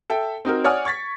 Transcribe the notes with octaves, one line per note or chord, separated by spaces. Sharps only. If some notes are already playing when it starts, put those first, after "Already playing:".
A4 E5 G5
C4 D#4 F#4 A#4
C#5 D5 F#5 G#5 D#6 F6
C#6 G#6 A6 B6